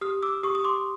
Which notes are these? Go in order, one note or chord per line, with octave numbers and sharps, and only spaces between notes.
G4 D#6 F6
D6 E6
G4 C#6 D#6
D#6
C6 D6